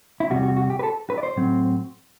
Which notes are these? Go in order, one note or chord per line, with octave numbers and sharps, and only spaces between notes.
E4
E2 C3 G3 F#4
F#4
F#4
G4
B4
A4
B4
D5
C5
A2 F#3 C4